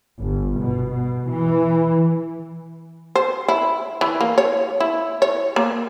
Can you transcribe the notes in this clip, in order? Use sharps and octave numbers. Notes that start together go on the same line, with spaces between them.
G1
B2
B2
E3
C5
E4
E3
A#3
C#5
E4
C#5
A#3